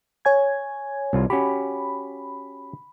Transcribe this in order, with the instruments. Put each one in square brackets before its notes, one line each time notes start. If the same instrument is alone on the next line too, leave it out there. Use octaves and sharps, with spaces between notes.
[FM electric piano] C#5 G#5 G#6
[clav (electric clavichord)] C2 F4
[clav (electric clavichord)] C#4 F#4 G4 [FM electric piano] B5